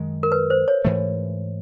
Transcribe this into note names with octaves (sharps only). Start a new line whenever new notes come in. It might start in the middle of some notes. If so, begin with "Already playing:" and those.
Already playing: F#2 D#3 G#3
A#4
B4
C5
C#5
G#2 E3 A3